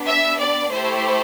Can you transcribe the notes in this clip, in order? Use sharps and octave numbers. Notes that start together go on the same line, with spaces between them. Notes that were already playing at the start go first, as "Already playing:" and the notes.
Already playing: B3 D4 G4
E5
D5
A3 E4 G4 C5